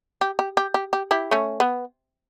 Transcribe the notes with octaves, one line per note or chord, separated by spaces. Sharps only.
G4
G4
G4
G4
G4
E4 G4
A3 C#4
B3